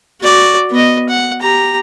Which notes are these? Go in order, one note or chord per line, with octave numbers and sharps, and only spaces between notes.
F#4 D5
B3 D#5
F#5
G4 A#5